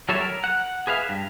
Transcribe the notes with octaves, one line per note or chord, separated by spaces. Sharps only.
F#3 G3 A4 C#5 E5
A#4
F#5
G#4 B4 E5 F5
G2